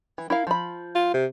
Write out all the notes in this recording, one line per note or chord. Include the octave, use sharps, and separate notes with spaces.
E3
E4 A#4 F5
F3 B5
F4
C3